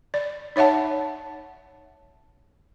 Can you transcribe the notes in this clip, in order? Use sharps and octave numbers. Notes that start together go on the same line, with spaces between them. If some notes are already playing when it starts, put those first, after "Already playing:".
D5
D#4 C#5 E5 F#5 A5